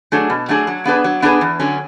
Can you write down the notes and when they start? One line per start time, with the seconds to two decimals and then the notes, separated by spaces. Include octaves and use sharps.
0.12 F#3 A3 D4 G#4
0.30 B2
0.49 F#3 A3 D4 G#4
0.67 F#3
0.85 B3 D4 G#4 B4
1.04 F#3
1.22 B3 D4 G#4 B4
1.41 E2
1.59 D3 F#3 C#4